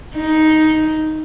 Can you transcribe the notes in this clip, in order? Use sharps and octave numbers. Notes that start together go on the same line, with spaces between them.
D#4